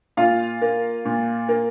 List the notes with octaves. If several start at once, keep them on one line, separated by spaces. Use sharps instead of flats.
A#2 F4 F5
A#3
A#2
A#3